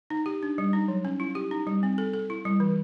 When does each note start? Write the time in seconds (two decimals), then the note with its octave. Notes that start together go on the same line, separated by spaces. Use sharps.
0.10 D#4
0.26 G4
0.43 D4
0.58 G3
0.73 D#4
0.88 F#3
1.05 C#4
1.20 E4
1.35 G4
1.51 D#4
1.67 G3
1.83 C4
1.98 A4
2.13 A4
2.30 E4
2.45 G3
2.60 E3